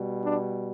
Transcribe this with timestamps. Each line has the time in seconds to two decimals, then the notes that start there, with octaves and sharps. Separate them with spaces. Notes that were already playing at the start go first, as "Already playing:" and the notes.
Already playing: B2 G3
0.24 D4